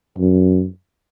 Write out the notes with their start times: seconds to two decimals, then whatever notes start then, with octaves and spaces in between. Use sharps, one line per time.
0.18 F#2